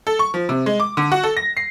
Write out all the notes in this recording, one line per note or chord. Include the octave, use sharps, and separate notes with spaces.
A4
C#6
F3
C3
G#3
D6
D3
F#4
A4
A#6
C7